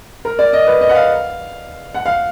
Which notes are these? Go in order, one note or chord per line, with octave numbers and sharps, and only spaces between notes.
A#4
D5
D#5
B4
D#5
F#5
F5
F#5
F5